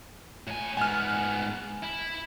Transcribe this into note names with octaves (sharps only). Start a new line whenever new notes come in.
A2 G#5
G#2 B3 G#5 F6
E4